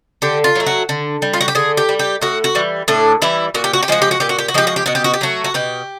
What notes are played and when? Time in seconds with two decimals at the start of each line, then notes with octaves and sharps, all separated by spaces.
0.22 D3 G4
0.44 F4
0.55 F#3 A3
0.66 F#4
0.89 D3
1.22 G3
1.33 F4
1.41 F#4
1.48 G4
1.55 D3 G#4
1.77 G4
1.89 G3
1.99 G4
2.21 A2 F#4
2.44 F#4
2.55 E3 G3
2.88 A2 D4
3.22 E3 G3 E4
3.55 A#2 F#4
3.64 G4
3.73 F#4
3.83 G4
3.88 F3 G#3 F#4
4.02 G4
4.11 F#4
4.20 A#2 G4
4.29 F#4
4.38 G4
4.48 F#4
4.54 F3 G#3 G4
4.67 F#4
4.76 G4
4.86 B2 F#4
4.95 G4
5.04 F#4
5.14 G4
5.21 F#3 A3 F#4
5.44 F#4
5.54 B2 G4